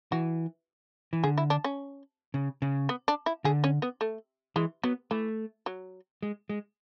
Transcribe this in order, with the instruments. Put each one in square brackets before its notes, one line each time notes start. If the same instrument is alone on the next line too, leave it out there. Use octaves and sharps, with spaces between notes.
[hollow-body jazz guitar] E3 [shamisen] F#4
[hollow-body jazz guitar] E3
[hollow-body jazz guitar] D3 [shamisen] G#4
[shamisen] E4
D4
C#4
[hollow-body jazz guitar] C#3
C#3
[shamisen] B3
D4
E4
[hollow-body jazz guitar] D3 [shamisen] G#4
[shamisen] C#4
B3
A3
[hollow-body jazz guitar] E3 [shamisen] G#3
[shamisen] F#3 [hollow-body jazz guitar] B3
[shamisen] E3 [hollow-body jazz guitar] A3
[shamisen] F#3
[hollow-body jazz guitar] G#3
G#3